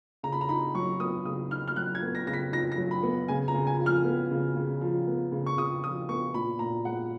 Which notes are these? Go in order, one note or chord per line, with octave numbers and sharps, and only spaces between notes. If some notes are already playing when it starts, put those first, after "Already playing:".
C#3 A#5
B5
A#5
D#4 B5
F#3 C#6
B3 D#6
C#3 D#6
D#4 F6
F6
F#3 F#6
G#6
B3
A#6
C#3 A#6
B6
D#4 A#6
A#6
F#3
B5
B3
C#3 G#5
A#5
C#3
G#5
F3
F6
B3
C#3
C#3
F3
B3
C#3
C#6
C#3 D#6
F3 D#6
B3 C#6
A#2 B5
A#2 A#5
G#3 F#5